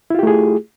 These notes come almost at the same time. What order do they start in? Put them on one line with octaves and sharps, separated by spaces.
E4 F4 G4 A3 G#4